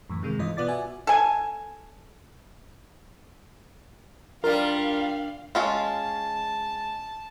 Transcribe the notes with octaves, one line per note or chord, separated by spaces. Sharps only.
F#2 A2 E3
C3 D#3 G#3 A#3
G2 E3 F4 D#5
B2 B3 F4 D5 D6 A6
F#4 E5 G#5
A4 G#5
G3 D4 F4 A#4 F5
G#3 C#4 F4 A5